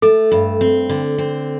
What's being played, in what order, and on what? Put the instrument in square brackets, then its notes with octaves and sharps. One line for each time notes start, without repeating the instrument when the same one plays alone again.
[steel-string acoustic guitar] A3 [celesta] A4
[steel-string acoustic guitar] G2
C4
D3
C4